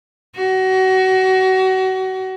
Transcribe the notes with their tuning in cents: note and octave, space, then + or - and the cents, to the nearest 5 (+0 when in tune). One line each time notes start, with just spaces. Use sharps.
F#4 +30